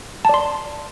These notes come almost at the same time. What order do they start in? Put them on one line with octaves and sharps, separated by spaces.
A5 D5 C6